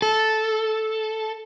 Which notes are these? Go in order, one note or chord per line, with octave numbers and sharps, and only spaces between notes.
A4